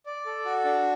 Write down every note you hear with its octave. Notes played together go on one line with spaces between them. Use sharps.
D5
A4
F#4
D4